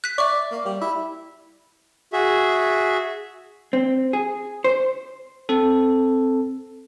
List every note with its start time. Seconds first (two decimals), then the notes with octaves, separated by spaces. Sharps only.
0.04 F#6 B6
0.18 D5 E5 C#6
0.52 A#3
0.66 G3
0.82 E4
2.13 F#4 G#4 E5
3.73 C4
4.13 G#4
4.64 C5
5.49 C4 A4